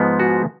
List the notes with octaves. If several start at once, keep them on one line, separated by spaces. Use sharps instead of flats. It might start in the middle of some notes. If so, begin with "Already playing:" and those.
Already playing: G#2 F3 G#3 B3
F#4